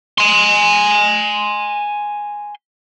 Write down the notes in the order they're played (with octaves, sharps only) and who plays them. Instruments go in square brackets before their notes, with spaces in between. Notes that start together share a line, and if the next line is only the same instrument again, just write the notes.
[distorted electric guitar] G#5 C6